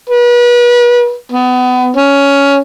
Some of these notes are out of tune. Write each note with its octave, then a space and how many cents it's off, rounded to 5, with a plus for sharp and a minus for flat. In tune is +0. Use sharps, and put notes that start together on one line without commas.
B4 -35
B3 +25
C#4 +10